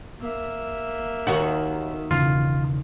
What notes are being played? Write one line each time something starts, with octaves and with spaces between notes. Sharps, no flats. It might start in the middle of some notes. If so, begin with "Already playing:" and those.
A#3 E5
D#2 D#3 F#4
E1 C#3 E3 F4